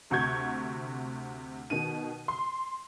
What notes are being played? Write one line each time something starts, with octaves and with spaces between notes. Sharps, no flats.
D2 C3 F#4 C#6 G6 G#6
B2 D#3 D#7
C6